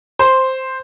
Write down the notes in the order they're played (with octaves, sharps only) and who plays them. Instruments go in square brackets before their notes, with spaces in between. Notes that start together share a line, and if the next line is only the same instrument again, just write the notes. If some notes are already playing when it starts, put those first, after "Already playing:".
[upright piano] C5